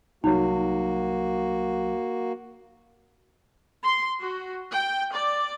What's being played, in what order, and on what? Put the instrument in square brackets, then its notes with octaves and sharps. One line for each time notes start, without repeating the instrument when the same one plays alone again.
[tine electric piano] C2 F#3 [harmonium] A#3 F#4 [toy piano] D#4
[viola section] C6
F#4
G5
D5